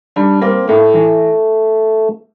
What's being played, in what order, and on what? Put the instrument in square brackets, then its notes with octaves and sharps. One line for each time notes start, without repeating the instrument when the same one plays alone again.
[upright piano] G3 [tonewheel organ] D4
[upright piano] A#3 [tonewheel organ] C4
[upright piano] A2 [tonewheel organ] A3
[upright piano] E3